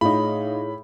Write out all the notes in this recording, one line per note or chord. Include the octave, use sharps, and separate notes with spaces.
A2 D#4 F4 G#4 C#5 B5